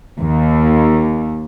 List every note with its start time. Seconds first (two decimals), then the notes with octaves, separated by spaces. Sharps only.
0.19 D#2